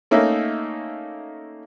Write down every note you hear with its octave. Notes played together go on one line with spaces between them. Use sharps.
A3 A#3 C#4 D#4 E5